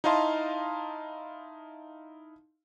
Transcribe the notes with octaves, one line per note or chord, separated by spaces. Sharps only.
D#4 E4 D#5 F5 A5 C6